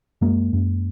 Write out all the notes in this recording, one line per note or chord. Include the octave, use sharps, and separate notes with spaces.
F#2 G#3 A#3
F#2